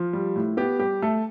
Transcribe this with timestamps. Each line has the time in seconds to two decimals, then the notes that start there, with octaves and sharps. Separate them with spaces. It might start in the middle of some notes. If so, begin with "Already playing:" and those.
Already playing: F3
0.13 G3
0.36 A2
0.57 B3 G4
0.79 G3 G4
1.02 A3 A4